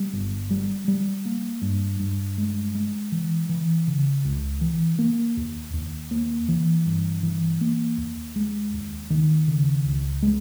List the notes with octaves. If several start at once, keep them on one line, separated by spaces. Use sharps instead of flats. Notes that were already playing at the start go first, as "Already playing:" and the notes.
Already playing: G3
G1
G3
G3
A#3
G2
G2
G#3
G#3
E3
E3
C#3
C#2
E3
A#3
D#2
D#2
A#3
E3
G2
E3
A#3
D#2
G#3
D#2
D#3
C#3
C#2
G#3